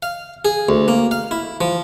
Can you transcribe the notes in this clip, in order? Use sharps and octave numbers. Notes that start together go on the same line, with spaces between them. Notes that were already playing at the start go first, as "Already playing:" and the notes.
F5
G#4
D2
A#3
F5
E4
F3